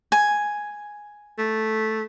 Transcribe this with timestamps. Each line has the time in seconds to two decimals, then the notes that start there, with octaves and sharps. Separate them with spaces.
0.12 G#5
1.38 A3